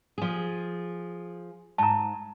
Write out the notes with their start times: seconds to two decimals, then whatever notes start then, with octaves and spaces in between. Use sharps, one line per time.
0.18 F3 G#4
1.78 G#2 A5 A#5